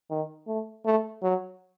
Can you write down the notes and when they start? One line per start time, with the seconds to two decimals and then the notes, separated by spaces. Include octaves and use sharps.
0.10 D#3
0.47 A3
0.85 A3
1.23 F#3